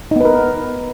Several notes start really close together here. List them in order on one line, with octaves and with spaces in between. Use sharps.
D#4 B3 B4 A#4